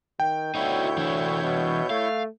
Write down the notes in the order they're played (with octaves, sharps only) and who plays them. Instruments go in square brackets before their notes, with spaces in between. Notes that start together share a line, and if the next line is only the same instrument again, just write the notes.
[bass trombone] D#3 [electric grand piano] G5
[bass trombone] D2 [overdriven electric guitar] D#4 F#4 [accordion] E4 C#5 G6
[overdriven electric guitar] E3 D4
[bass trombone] B2
[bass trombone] A3 [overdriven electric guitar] F5